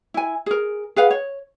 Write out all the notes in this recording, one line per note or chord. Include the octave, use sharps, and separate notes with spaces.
E4 G#5
G#4 A#4
G#4 B4 F5 F#5
C#5